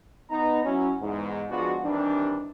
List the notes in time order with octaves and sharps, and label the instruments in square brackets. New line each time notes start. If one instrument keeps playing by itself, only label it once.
[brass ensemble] B3 D#4 A#5
F#3 C#4 E4
E2 G#2
F3 G#3 B3 D4 F4 F#4
C3 D#3 E3 G3 D4